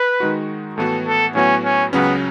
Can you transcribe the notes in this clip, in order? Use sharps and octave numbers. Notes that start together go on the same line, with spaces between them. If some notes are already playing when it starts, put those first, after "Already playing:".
Already playing: B4
D#3 G#3 D#4 F#4
A2 E3 B3 F#4 A4
A4
A2 F#3 B3 C#4 F#4
C#4
C#2 C#3 F#3 B3 C#4